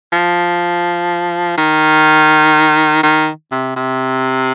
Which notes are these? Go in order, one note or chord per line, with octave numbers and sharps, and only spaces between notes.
F3
D#3
D#3
C3
C3